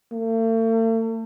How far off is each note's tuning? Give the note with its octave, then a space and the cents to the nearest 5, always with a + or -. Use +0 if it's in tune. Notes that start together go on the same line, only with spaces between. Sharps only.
A3 +45